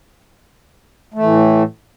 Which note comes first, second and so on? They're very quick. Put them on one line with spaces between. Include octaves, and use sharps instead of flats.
A3 E3 A2